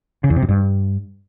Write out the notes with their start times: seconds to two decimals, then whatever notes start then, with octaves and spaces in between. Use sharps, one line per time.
0.24 C#3
0.30 E2
0.36 C3
0.42 F#2
0.49 G2